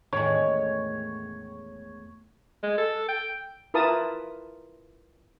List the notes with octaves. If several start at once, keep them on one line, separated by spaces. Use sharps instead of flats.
E2 A2 D#3 G#3 C#4 C#5
G#3
A4
G5
E4 F4 A#4 B4 A5 D#6